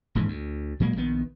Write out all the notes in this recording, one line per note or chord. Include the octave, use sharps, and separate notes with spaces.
D#1 G#2 E3
D2
A#2 F#3 G#3 A#3
A#1 D#3 B3